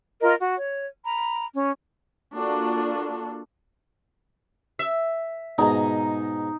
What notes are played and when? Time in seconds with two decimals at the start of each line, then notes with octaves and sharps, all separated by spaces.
0.21 F4 A#4 D#5
0.39 F#4
0.56 C#5
1.04 A#5 B5
1.53 C#4
2.35 A#3 D4 F4 F#4 A4
4.79 E5
5.58 G#2 B2 D#4 A#5